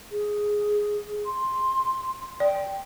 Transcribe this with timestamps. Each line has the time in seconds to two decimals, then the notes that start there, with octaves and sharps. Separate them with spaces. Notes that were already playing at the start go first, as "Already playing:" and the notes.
0.11 G#4
1.25 C6
2.40 D5 G5